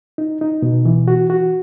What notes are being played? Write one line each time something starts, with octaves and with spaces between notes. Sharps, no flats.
D#4
D#4
B2
E3
F#4
F#4